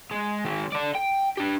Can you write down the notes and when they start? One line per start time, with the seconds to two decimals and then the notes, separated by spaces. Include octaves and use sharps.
0.11 G#3
0.45 D#3 G#3
0.72 A4 D5
0.95 G5
1.37 D4 G4